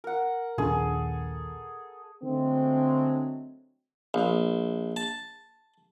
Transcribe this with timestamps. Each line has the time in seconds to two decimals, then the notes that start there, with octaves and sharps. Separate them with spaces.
0.04 A#4 F#5
0.58 A#1 D#2 D4 G#4 A4
2.22 D3 F#3 G#3 A3 C4
4.14 A#1
4.96 A5